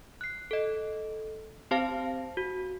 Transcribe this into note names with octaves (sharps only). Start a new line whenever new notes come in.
F#6 C7
A4 D#5
C4 G4 C5 F5 A5 A#6
F#4